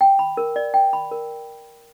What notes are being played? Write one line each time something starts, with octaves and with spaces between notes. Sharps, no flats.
G5
B5
A#4
D5
G5
B5
A#4